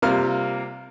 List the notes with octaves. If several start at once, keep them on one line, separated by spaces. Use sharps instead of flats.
C3 G3 A#3 F4 F6